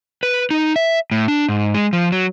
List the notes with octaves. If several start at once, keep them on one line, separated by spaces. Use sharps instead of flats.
B4
D#4
E5
A2
D4
G#2
G#3
F3
F#3